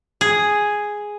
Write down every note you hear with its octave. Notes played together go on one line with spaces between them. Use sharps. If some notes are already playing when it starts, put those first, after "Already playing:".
G#4